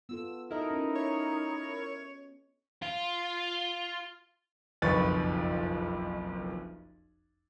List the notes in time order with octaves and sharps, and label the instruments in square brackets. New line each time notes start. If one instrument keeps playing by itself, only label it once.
[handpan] B3 F4 A4 [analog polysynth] E6
[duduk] D#4 [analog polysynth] E4 A#4 [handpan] F#4 A4 D#5
[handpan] C#4
[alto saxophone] C#5
[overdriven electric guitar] F4
[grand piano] F#1 B1 F2 B4 C#6 A6